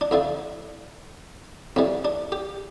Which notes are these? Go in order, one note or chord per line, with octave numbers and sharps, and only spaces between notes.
D4
F2 D3 F3 E4
F2 E3 G3 C4
D4
G4